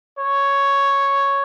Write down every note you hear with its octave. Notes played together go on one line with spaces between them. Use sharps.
C#5